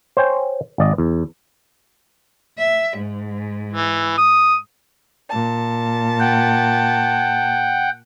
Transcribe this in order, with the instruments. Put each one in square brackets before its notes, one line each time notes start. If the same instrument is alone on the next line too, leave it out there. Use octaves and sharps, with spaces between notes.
[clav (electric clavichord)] C5 C#5 G5 G#5
G#1 D5 D#5
E2
[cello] E5
G#2
[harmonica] E3
D#6
[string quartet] A#2 A5
[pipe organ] F#5 G5